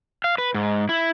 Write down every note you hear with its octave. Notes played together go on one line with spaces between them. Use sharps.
F5
B4
G#2
E4